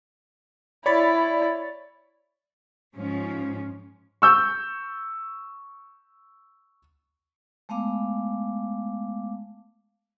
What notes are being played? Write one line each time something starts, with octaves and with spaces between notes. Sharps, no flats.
E4 C#5 D5 B5 A6
G#2 F3 C#4
C#6 E6 G6
G#3 A3 B3 F5 D6